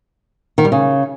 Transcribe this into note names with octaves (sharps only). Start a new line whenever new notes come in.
D#3
G3
C#3